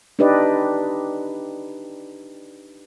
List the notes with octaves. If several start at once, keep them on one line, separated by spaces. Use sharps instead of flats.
D4 D#4 G4 B4 D5 D#5